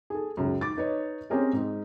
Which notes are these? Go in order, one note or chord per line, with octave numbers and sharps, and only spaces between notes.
G#4 A4
C#2 F#2
D6 A6
D#4 B4 C#5 D#5
C4 C#4 G4 G#4 A#4 C#5
G#2 D#4